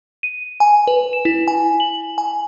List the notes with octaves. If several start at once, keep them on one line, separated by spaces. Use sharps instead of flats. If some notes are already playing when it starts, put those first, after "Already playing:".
D#7
G#5
B4
E7
E4
G#5
F#7
G#5